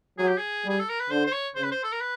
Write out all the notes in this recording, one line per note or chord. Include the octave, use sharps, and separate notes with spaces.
F#3 G#4
G4
G#4
G3
G#4
A4
A#4
B4
D3 C5
C5
C#5
C#3 C5
B4
C5
A4
A#4
B4